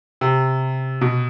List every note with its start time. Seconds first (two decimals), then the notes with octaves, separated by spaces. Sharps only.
0.21 C3
1.01 B2